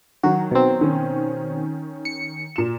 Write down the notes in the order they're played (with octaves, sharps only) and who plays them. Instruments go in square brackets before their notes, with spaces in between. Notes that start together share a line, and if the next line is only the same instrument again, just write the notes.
[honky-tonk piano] D#3 F#3 [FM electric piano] F#4
[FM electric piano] B2 C4
[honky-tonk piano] D#3 C#4
[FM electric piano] C#7
[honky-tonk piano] A#2 E7